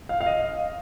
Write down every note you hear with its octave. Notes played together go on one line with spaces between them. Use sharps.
F5
F5
D#5